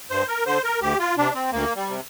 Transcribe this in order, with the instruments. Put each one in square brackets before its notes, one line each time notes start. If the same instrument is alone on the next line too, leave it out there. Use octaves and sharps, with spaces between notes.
[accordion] G2 C5
A#4
D3 C5
A#4
D2 G4
F4
C3 D4
C4
D2 A#3
G3
C3